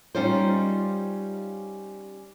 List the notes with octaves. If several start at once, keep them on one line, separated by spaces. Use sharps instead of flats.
G3 C#4 D#4 F4 G4 C5